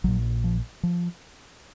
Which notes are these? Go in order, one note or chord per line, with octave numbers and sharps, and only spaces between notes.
A#1 A#2 F#3
F3
F3